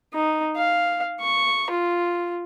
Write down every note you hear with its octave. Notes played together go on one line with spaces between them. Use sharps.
D#4
F5
C#6
F4